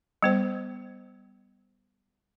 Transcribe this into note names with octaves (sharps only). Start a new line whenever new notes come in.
G3 B3 C5